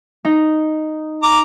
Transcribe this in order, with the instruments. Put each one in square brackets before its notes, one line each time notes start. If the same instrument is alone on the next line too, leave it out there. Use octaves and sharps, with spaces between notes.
[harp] D#4
[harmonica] A#5 D6